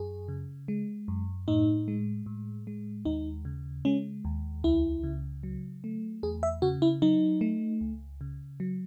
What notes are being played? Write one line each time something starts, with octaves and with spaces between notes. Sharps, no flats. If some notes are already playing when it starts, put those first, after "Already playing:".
Already playing: F#2 G#4
C#3
G#3
F#2
A2 D#4
G#3
A2
G#3
D#2 D#4
C#3
G#3 C#4
D#2
C#2 E4
C#3
F#3
A3
E2 G#4
E5
C#3 F#4
E4
F#3 D#4
A3
C#2
C#3
F#3